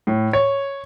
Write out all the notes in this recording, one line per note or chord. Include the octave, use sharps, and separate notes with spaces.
A2
C#5